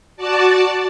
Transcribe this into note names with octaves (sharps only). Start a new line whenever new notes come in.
F#4 D5 A5